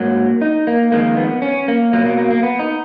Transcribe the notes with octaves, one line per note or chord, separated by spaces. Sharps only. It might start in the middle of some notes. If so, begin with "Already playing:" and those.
Already playing: G#2 F#3 A#3
D#4
A#3
F2 D#3 G#3 A#3
B3
C#4
A#3
B2 F#3 A#3
A#3
A#3
A#3
B3
D#4